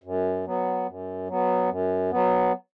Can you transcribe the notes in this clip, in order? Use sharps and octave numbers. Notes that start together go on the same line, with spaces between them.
F#2
F#3 B3
F#2
F#3 B3
F#2
F#3 B3